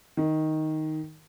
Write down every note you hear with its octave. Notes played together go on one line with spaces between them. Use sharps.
D#3